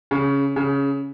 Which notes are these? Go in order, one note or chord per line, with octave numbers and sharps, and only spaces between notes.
C#3
C#3